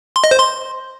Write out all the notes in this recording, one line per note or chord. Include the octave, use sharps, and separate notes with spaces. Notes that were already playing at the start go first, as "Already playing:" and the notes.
C6
D#5
C5
C6